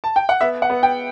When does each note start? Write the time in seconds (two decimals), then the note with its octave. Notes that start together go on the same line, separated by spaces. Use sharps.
0.04 A5
0.16 G5
0.29 F#5
0.41 B3 E5
0.62 F#5
0.70 B3
0.83 G5